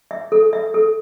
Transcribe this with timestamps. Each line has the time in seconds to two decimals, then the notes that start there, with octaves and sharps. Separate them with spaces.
0.11 E5
0.32 A4
0.53 E5
0.74 A4